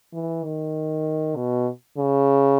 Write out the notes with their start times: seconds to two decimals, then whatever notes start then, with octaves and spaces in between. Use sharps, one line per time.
0.13 E3
0.44 D#3
1.36 B2
1.98 C#3